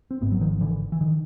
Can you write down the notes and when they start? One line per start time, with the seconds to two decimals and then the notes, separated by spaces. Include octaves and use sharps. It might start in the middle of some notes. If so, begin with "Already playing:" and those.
0.11 C4
0.21 G#1 G#2 A3 B3
0.32 F#3
0.41 D#3 F3
0.61 D3 E3
0.92 E3
1.01 D3 D#3